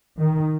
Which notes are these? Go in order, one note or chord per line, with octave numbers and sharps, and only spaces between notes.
D#3